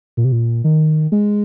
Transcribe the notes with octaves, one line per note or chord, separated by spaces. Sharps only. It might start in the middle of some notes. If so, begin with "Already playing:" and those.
A#2
C3
A#2
D#3
G#3